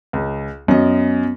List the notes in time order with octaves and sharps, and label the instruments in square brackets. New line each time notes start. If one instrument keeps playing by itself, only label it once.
[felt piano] C#2
[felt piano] F#2 D#5 [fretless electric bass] B3 C#4